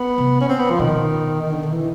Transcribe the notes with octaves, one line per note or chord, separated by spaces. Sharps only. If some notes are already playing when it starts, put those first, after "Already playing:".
Already playing: B3
C3
C#4
C4
B3
F3
B2 D#3
D#3
D3
D#3
E3